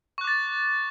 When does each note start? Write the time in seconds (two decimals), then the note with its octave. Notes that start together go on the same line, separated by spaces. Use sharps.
0.18 C#6
0.21 F#6
0.24 D6
0.27 A6